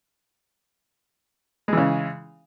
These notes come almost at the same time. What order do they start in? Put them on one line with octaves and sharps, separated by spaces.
G#3 E3 C#3